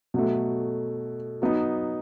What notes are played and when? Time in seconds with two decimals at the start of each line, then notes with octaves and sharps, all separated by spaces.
0.14 B2 F#3 A3
1.42 F#3 B3 D#4